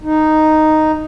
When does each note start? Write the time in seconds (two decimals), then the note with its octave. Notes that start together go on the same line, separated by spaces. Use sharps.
0.03 D#4